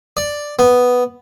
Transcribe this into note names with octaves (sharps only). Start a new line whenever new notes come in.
D5
B3